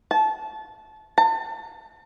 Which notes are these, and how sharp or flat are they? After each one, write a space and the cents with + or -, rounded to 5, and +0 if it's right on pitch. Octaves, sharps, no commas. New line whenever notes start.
A5 -25
A5 +40